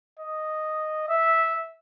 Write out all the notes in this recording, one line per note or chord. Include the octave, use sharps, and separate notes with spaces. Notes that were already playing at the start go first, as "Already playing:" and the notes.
D#5
E5